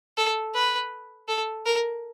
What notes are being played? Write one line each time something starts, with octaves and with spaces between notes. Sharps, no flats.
A4
B4
A4
A#4